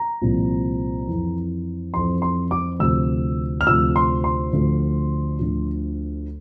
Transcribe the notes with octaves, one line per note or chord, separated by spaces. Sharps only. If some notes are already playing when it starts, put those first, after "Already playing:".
Already playing: A#5
C2 A#2 F3
F2 E3
F2 E3 C6
C6
D6
D2 C3 F3 E6
F6
D2 C3 F3 E6
C6
C6
D2 D3 F3
D2 D3 F3